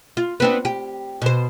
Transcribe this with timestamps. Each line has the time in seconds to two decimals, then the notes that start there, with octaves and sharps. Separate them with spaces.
0.17 F4
0.40 B3 C4 D4
0.65 G4
1.22 B2 C5